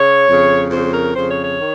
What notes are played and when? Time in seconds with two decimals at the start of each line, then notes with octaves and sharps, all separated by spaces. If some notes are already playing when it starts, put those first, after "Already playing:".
Already playing: C#3 C#5
0.27 F2 C#3
0.70 F2 C#3 C5
0.93 A#4
1.15 F2 C#3 C5
1.29 C#5
1.43 C#5
1.58 D#3